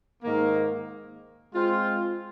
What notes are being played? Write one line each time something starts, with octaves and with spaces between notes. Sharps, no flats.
G#2 D#3 A#3
G#3 C4 F4